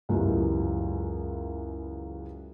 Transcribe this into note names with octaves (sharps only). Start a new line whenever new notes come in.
C#2 F#2 E3 G3